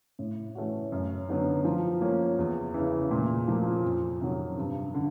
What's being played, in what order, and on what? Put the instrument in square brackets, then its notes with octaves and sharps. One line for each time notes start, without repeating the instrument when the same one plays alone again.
[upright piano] A2
E3 A3 C#4 F#4
F#2
D3 F#3 B3 D#4
F3
A#3 C#4
E2
C#3 E3
A#2
F3 A#3
F2
C3 D#3 F#3
G2
D3